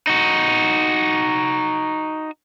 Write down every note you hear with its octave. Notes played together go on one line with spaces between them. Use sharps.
D#4 F#4